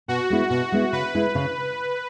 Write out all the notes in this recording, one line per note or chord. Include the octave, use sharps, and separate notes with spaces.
B2 F#4
G#3 B3 E4
B2 F#4
G#3 B3 E4
C#3 B4
G#3 E4
C#3